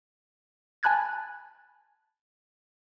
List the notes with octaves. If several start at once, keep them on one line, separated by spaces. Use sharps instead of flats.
G#5 A5 B5 F#6 G#6 A6